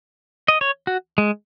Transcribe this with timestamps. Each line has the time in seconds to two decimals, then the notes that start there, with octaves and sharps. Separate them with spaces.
0.48 D#5
0.61 C#5
0.87 F#4
1.18 G#3